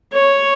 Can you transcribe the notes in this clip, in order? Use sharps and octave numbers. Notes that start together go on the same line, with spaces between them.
C#5